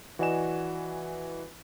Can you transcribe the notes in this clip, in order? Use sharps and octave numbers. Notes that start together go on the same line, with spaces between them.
E3 F#4 D5 D#5 G#5 E7